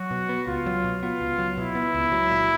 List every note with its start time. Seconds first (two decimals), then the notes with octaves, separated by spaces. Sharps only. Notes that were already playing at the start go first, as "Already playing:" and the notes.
Already playing: F#3 F#4
0.11 B2
0.29 B3
0.47 C#2 F4
0.66 F#3
0.84 B2
1.02 B3 F4
1.21 C#2
1.38 F#3
1.57 B2 E4
1.75 B3
1.95 C#2
2.12 F#3
2.31 A#2